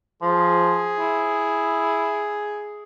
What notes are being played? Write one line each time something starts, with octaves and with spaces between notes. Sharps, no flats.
F3 G#4
E4